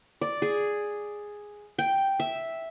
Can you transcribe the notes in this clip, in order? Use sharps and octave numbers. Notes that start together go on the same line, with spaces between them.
D5
G#4
G5
E5